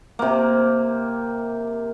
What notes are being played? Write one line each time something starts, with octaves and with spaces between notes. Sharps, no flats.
C3 A#3